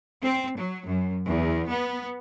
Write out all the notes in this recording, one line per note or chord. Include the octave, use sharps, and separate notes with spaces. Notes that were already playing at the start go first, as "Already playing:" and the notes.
C4
F#3
F#2
E2
B3